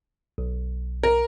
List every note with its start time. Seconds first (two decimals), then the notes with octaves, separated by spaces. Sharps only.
0.38 B1
1.03 A#4